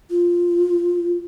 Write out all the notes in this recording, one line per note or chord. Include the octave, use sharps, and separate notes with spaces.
F4